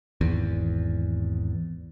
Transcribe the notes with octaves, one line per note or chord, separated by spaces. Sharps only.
G#1 E2